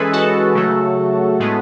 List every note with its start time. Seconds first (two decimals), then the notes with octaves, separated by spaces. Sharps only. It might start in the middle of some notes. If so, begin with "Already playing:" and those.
Already playing: E3 G#3 C#4 G#4 A4 B4
0.13 F#4 A4
0.55 C#3 F#3 A3
1.40 A2 G#3 B3